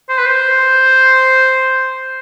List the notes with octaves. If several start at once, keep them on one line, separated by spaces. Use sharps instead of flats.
C5
B4
C5